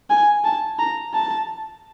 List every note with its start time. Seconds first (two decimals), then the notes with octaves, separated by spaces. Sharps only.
0.10 G#5
0.44 A5
0.79 A#5
1.14 A5